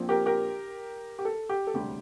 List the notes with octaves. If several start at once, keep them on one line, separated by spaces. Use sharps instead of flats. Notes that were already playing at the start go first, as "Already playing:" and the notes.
Already playing: A#1 A#2 F3 C4
G4 A#4
G4 A#4
G4
A4
G4
A4
E1 D2 C3 G3 G4